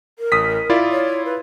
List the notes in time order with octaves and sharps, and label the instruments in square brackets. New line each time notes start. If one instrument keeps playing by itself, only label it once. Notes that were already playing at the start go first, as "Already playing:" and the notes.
[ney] A#4
[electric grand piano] A1 D#6 B6
E4 F4 D5
[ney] C#5
B4